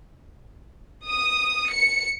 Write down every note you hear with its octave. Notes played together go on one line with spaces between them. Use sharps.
D#6
C#7